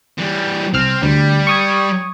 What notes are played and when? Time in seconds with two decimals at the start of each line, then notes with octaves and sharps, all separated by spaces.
0.18 E3 G3
0.74 C2 C4 F6
1.02 D2 G3
1.47 C#6 D#6 G#6